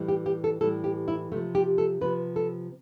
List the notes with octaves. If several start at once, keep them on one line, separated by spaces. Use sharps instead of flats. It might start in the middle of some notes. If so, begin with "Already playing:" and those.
Already playing: A2 E3 G3
G4
G4
A4
A2 E3 G3 A4
G4
E4
C3 F3 A3
G4
A4
C3 F3 B4
A4